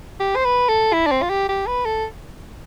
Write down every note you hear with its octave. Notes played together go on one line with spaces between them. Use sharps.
G4
C5
B4
A4
E4
D4
C4
F4
G4
G4
B4
A4